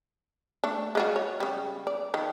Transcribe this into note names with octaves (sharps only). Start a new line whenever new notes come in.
A3 D4
G#3 F4 F#4
C#5
C#3 G3
D5
D#3 F3